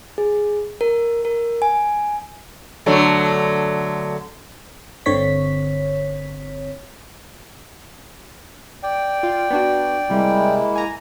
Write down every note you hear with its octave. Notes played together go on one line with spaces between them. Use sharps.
G#4
A#4
A#4
G#5
D3 F#3 A3
G1 D3 C4 C#5 B6
D5 G5
F4
B3 D4 F#4
C3 G3 G#3 A#3 E4
G#5 A#5